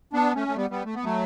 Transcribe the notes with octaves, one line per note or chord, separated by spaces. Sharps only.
B3 D4
A3 C#4
A3
G3 B3
G3 B3
A3
B3
F#3 A3